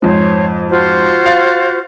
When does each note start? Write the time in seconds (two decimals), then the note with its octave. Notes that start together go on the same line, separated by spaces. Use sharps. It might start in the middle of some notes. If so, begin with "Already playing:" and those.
0.02 F2 G#2 C5 C#5
0.69 F4 F#4 C5
1.26 F5 A6